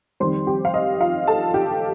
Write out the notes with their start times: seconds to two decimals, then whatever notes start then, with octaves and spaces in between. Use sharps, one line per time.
0.20 F2 D#3 G3 C5 C6
0.47 G4 G5
0.65 F5
0.74 D#5
1.00 F4 F5
1.27 A4 A5
1.54 G4 G5